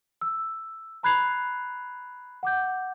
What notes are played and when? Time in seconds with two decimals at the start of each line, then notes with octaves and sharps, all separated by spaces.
0.21 E6
1.03 A#5 B5 F#6 G#6 C7 F7
2.43 F#5 D6 G6